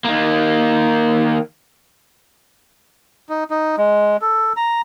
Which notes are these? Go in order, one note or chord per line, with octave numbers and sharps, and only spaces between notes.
D#3 A#3
D#4
D#4
G#3
A4
A#5